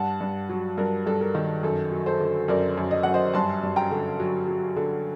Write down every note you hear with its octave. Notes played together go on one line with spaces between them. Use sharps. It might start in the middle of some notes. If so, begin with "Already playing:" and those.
Already playing: G2 F#5 A5
G2
F#3
G2 A#4
G2 A4
A#4
D#3
F#2 A4
F#3
A4 C5
D3
F#2 A#4 D5
F#2
D#5
F#2 F#5
C5 D#5
G2 A5 C6
G2
G5 A#5
D3
F#3
F#3
D3